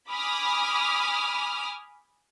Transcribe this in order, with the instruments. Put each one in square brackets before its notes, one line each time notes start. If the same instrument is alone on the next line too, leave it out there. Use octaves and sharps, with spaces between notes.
[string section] G#5 B5 D6 D#6 F6